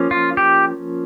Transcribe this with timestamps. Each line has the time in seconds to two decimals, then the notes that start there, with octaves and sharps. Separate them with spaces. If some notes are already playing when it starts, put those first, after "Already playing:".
Already playing: F3 A#3 C#4
0.11 F4
0.37 G4